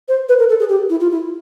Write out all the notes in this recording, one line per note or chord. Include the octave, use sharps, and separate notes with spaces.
C5
B4
A#4
A4
G#4
G4
E4
F4
E4